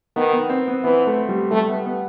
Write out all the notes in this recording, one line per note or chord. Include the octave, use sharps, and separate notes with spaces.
D#3 B3
B3
C4
B3
E3 B3
A3
G3
G3 A3
B3
B3